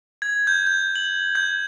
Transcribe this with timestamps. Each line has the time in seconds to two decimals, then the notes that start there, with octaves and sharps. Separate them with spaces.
0.22 G#6
0.47 G6
0.67 G6
0.95 F#7
1.35 G6